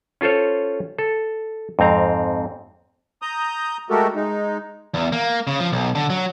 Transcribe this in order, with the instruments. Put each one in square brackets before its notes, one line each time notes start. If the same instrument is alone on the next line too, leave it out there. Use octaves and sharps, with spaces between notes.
[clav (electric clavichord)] C#4 F4 A4 C5 C#5
A4
F2 G#2 C4 A#5
[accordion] A#5 D#6 G6
G#3 A3 F#4 G4 A4 A#4
G#3 D#4
[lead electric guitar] E2
A#3
C#3
F3
B1
D3
F#3